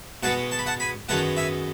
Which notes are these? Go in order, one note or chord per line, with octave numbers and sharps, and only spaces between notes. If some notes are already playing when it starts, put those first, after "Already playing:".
B2 G#3 B3 F#5 A5
A5
B5
F#5 A5
G#5 B5
F#2 D#3 G#3 B3 F#5 A5
E5 G#5